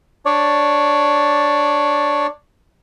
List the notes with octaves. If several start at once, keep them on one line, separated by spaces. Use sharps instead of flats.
D4 C#5 D5